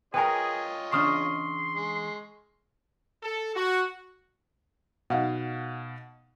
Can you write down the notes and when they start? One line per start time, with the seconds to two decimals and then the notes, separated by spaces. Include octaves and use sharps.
0.14 F4 G#4 A#4 B4 C#5 D#5 G5 G#5
0.92 E2 C#3 D4 C6 C#6 D#6 F6
1.75 G#3
3.23 A4
3.56 F#4
5.10 B2 D#4 F5 F#5